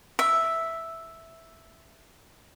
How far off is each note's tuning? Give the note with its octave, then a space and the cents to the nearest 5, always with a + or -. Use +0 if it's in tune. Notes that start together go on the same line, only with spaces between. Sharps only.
E5 +0